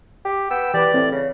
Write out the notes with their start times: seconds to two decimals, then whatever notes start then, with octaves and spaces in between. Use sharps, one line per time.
0.25 G4
0.50 B3 G5 E6
0.74 E3 G4 B4 D5
0.94 A2 C4
1.12 C#3